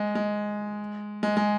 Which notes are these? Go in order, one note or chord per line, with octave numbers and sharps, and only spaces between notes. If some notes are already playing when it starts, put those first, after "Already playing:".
Already playing: G#3
G#3
G#3
G#3